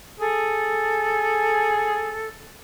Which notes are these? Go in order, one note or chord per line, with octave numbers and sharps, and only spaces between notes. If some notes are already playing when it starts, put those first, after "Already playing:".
G#4 A4